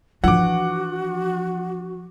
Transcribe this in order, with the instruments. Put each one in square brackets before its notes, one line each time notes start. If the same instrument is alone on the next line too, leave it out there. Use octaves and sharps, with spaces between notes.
[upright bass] E3 D4 [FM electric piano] F3 [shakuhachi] F#4 [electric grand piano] F#5 D6